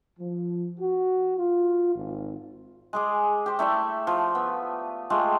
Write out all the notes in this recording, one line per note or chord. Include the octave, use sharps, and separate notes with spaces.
F3
F#4
F4
G#1
G#3 G#4 D6
G4 C5
A3 E4 D5 E5
F3
B3
G#3 A3 F4 G4